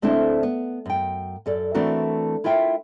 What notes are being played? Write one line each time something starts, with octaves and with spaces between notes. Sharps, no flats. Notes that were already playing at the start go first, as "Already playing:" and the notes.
D2 A3 C4 D4 E4 C5
B3
F#2 G5
F#2 A4 D5
E3 A3 C4 D4 F#4 A#4
E4 F4 A#4 E5 G5